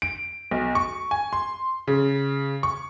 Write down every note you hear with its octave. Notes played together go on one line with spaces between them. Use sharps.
D7
B1
C#6
G#5
C6
C#3
C#6